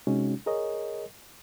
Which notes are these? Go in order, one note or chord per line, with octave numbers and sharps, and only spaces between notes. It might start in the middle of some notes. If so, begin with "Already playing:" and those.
C3 G#3 C#4 D#4 F#4
G#4 A#4 C#5 D#5